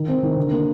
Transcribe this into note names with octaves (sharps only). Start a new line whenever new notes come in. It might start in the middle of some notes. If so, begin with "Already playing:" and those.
Already playing: D#3
C4
D#3
D3
A#3